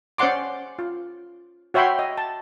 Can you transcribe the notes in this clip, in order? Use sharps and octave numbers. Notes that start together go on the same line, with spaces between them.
C#4 C5 D5 F#5 C6 D6
F4
F#4 C#5 E5 G5 B5 C6
D#5
A5